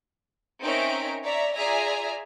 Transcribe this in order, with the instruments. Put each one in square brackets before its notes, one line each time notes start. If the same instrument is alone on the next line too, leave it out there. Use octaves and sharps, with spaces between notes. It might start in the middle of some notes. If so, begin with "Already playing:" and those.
[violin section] C4 C#4 D#4 A#4 E5 D7
C#5 D5 E5 A#5
F4 G#4 D5 E5 G#5 A#5